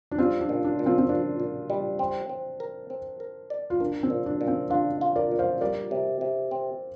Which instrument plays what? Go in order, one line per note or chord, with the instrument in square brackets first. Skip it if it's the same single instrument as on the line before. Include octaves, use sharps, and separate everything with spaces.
[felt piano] D4
[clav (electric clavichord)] G3 [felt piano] C4 F4
[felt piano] D4
[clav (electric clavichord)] A#2
[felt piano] D4
[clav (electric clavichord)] A#2
[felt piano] C4 F4
C4
[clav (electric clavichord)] A#2 [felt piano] D4
[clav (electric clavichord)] A#2
G3
C4
C4
A#4
C4
A#4
D5
[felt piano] F4
[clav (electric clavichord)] A#3 [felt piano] D4
[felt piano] C4
[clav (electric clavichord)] A#2
[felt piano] D4
[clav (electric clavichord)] A#2
[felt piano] C4
[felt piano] D4 [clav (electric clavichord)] F4
[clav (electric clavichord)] F4
[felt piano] A#4 D5
[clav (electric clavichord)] A#2
[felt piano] C5 F5
[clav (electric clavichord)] G3 [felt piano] A#4 D5
[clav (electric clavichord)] C3
C3
C4